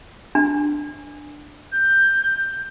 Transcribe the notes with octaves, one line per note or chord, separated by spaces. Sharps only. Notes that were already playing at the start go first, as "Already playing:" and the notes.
D4
G6